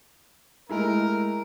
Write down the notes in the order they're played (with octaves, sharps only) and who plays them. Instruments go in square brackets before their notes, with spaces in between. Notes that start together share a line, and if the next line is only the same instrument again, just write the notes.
[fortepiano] G#3 A3 E4 [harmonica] A#4